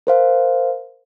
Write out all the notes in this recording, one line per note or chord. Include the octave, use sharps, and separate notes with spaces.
A#4 C5 F5